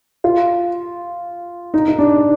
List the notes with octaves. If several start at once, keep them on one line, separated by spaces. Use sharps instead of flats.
F4
D#4
D#4
D4